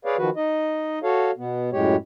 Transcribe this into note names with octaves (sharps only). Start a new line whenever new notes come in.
G#4 B4 C#5 D5 F5
D#3 F3 F#4 B4
D#4 D#5
F#4 A4 C#5 F5
B2 B3
F#2 A2 G#3 G4 C#5